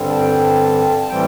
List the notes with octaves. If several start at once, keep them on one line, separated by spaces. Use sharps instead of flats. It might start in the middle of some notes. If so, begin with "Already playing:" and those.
Already playing: G2 D3 G3 C4
A5
G5
A5
A5
A2 E3 G3 C4 G5